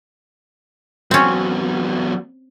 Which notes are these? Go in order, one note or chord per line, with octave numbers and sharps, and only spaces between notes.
E2 F#3 C4 C#4